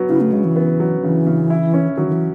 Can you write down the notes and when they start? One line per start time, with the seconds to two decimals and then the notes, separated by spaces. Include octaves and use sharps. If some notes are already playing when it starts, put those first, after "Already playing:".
Already playing: F#3 B3
0.09 C#3 E4
0.21 A3
0.32 C#3 G#3
0.44 E3
0.56 B3
0.80 F#3
1.03 C#3 E3
1.26 C#3
1.50 E4
1.74 C#4
1.97 D#3 F#3
2.08 D#3
2.13 E3